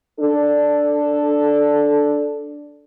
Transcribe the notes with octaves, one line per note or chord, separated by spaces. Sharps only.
D4 A4